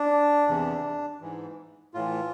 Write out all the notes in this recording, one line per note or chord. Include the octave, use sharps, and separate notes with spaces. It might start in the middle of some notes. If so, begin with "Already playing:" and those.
Already playing: D4
E2 C3 E3
G#2 E3
A2 E3 F4